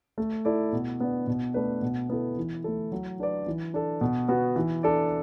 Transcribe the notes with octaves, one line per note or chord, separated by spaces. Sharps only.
A3
E4 A4 D5
B2
B3 D4
B2
A3 D4 B4
B2
B3 E4 A4
E3
A3 E4 A4
F#3
D4 B4 D5
E3
D4 A4
B2
B3 F#4
E3
D4 A4 D5